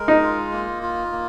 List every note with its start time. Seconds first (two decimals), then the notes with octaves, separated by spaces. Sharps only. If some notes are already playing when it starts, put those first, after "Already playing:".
Already playing: G#3 A#4
0.08 D#4
0.22 F4
0.52 A#3
0.83 F4
1.12 A#3